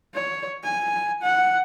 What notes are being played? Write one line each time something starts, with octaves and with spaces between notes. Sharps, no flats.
C#5
G#5
F#5